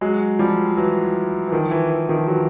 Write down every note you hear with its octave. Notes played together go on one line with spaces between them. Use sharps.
F#3 G#3
F3 G3
E3 F#3
E3
D#3 F3
E3
E3
D#3 F3
E3 F#3